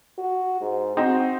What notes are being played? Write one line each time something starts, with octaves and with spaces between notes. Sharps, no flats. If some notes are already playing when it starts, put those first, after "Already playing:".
F#4
G#2
C4 D#4 F#4